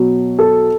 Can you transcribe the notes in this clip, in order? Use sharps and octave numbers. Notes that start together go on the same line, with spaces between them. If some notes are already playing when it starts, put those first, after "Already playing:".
Already playing: B2 F#3
A4